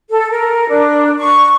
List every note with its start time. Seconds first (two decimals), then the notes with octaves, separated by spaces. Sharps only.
0.10 A4
0.30 A#4
0.69 D4
1.18 C#6